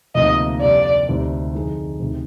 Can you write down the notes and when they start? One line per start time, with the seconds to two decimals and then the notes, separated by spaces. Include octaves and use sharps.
0.15 D2 C3 F3 A#3 D#4 D#5
0.61 F2 C3 G3 D4 D5
1.08 D2 C3 G3 C4 D#4
1.54 F2 D3 G#3 D#4
2.00 D2 C3 D#3